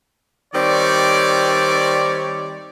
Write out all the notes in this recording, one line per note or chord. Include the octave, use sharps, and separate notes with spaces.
D#3 G3 C4 C#5 D5